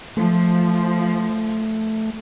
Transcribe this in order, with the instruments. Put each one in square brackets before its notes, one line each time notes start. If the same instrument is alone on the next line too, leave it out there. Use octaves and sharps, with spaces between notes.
[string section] F3 [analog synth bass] A3